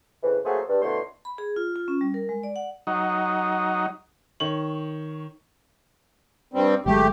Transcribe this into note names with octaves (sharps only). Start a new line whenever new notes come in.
F2 C#3 E3
F#3 A3 A#3 F#4 G#4 C5
G2
B2 D3 A3 E4 C#5 C6
B5
G#4
F4
F4
C#4
G3
A#4
G#3
D5
F#5
F#3 D#4
D#3 C#5 F#7
G2 G3 C4
G1 F#3 G#3 A3 G4